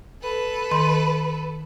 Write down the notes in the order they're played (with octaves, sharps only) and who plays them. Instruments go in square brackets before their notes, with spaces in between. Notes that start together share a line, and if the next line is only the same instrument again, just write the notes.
[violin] A4 B4
[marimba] D#3 C6